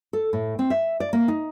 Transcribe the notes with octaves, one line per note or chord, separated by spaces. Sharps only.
A4
A2
C4
E5
D5
A#3
D#4